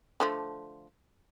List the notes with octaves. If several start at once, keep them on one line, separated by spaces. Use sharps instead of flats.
D3 F3 A3